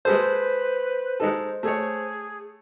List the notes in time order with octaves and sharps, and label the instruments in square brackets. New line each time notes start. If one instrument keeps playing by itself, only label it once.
[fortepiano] G#3 G#4 A4 [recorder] B4 [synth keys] C5
[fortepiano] G#3 D#4 A4
[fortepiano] A3 C#5 [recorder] G#4